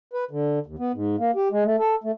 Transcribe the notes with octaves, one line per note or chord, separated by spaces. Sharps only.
B4
D3
D#2
B3
G#2
A#3
G4
G#3
A3
A4
A3